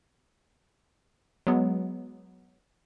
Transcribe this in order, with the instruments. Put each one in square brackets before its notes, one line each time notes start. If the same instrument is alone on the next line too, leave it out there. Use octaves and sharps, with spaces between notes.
[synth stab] F#3 G#3 B3